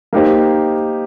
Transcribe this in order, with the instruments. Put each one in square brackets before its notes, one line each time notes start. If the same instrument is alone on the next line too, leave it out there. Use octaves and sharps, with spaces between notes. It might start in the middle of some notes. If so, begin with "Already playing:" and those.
[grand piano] A#3 D#4 G4 C5